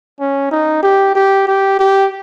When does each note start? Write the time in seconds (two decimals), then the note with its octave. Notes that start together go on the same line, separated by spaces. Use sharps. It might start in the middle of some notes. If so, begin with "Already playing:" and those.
0.20 C#4
0.51 D#4
0.83 G4
1.15 G4
1.47 G4
1.79 G4